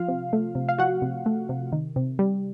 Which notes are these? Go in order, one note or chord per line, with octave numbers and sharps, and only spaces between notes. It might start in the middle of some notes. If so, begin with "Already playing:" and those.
Already playing: F3 F4 F5
C3
A3
C3
F5
F3 F#4 F#5
C3
A3
C3
D#3
C3
G3